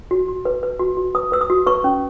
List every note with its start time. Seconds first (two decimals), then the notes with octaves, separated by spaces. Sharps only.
0.11 F#4
0.28 F#4
0.45 B4
0.63 B4
0.80 F#4
0.97 F#4
1.15 B4 D#6
1.32 B4 E6
1.41 D#6
1.50 F#4
1.67 B4 C#6
1.84 C#4